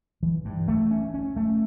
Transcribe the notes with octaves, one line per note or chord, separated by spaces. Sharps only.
E3
G2
A3
C#4
C#4
A3